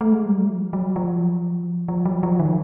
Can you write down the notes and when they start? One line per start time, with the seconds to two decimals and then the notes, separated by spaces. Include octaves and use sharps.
0.01 A3
0.13 G#3
0.26 G3
0.38 F#3
0.50 F3
0.73 F#3
0.96 F3
1.88 F3
2.05 F#3
2.23 F3
2.39 D#3